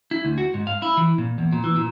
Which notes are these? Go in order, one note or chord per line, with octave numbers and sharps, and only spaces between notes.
E4
D2
F#4
G#2
F5
E4
E3
A#2
E2
A#2
E3
A#2